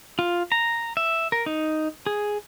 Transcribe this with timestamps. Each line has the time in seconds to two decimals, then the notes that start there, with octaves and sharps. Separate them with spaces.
0.19 F4
0.52 A#5
0.97 E5
1.32 A#4
1.46 D#4
2.06 G#4